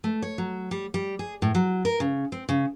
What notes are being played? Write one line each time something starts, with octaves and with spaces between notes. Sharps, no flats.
A3
C#5
F#3
G3
G3
G#4
A2
F#3
A#4
C#3
C4
C#3